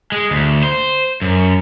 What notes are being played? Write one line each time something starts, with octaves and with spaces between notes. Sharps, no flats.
G#3
D2
C5
F#2